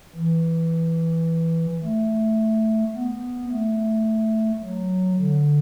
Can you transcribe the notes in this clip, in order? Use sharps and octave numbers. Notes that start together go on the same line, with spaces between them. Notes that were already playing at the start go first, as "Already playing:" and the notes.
E3
A3
B3
A3
F#3
D3